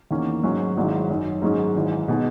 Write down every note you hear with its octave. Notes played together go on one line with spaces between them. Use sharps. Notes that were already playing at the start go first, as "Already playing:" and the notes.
E2 D#3 A#3 C#4
G#2 F#3 C#4
G#1 G#2 F#3 C#4 E4
G#1 F#2 D#3
G#2 D#3 F#3 C#4 G#4
G#1 G#2 E3
B2 G#3 D#4 G#4